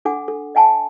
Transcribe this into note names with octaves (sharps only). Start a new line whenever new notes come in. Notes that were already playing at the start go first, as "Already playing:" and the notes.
D4 A4 F#5 G#5 D6
A4
D#5 F#5 G#5 A5